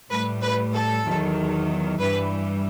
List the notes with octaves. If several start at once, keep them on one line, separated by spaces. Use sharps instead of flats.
A2 G3 B4
B4
A4
E2 D#3 F#3
G2 E3 G3 B4